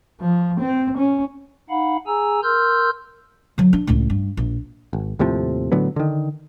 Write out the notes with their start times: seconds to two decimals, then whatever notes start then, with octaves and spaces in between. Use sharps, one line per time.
0.21 F3
0.60 C4
0.97 C#4
1.70 D#4 F5 F#5 B5
2.07 G#4 G#5 A#5 E6
2.43 A#4 C6 E6 F6 G6
3.58 D3 F#3
3.73 D4
3.87 C#2 A2
4.10 G2
4.37 A#1
4.93 G#1
5.19 D#2 A2 C3 F3
5.72 A2 D3 F#3 B3
5.96 D3 D#3